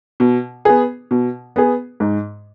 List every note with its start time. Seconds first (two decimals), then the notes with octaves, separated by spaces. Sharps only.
0.20 B2
0.65 B3 G#4
1.11 B2
1.56 B3 G#4
2.00 G#2